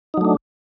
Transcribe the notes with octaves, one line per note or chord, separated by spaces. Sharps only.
F#3 A3 D4 D#4